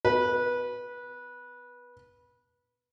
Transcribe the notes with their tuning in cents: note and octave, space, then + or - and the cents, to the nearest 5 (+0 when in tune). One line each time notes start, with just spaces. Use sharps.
B3 +35 B4 -20